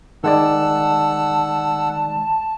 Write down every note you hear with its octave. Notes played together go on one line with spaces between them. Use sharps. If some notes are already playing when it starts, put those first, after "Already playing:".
D#3 G#3 D5 F#5 A5 E6